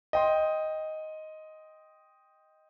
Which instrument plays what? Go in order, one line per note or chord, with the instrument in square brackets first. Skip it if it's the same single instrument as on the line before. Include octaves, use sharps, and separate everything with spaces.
[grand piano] D#5 G5 C6